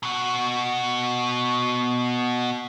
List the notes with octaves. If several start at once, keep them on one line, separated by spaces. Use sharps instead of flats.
B2 F#4